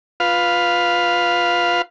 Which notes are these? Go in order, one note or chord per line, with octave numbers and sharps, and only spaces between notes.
F4 B4 F5